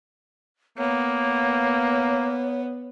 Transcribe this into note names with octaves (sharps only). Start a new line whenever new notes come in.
A#3 B3 C#5